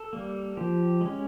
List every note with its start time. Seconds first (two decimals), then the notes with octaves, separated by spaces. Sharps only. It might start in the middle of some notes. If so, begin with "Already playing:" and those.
Already playing: A4
0.13 G3 A#3
0.57 F3 G4
1.01 G#3 C#4